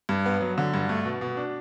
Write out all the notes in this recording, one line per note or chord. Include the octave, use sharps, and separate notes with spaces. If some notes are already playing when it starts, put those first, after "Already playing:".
G2
B3
F#3
D3
G2
A3
B2
B2
D4